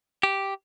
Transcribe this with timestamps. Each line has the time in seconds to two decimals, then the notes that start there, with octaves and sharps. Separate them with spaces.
0.23 G4